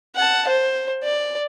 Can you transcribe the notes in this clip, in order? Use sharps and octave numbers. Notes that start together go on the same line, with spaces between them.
F#5 A5
C5
D5